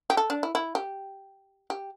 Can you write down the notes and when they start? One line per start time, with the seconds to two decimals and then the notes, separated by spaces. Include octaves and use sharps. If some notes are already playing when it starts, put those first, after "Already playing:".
0.10 G4
0.17 A4
0.30 D4
0.43 E4
0.55 E4
0.75 G4
1.70 G4